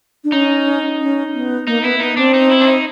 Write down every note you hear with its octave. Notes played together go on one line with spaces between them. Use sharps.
D4
C#4 D#4
C#4
B3
A#3 D#4
B3 E4
B3 D#4
C4 D4
D#4
E4
D4
D#4